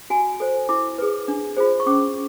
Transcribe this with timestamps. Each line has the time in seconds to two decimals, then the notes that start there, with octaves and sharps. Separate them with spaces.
0.10 F#4 G#5
0.40 A4 C5
0.69 E4 D6
0.98 G#4 B4
1.28 D4
1.57 F4 G#4 C5
1.80 C#6
1.86 C#4 D6